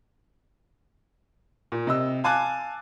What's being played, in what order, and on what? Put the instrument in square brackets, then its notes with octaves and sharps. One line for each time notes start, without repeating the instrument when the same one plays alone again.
[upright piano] A#2
C3 D#5 E6
F5 G#5 A5 D6 F#6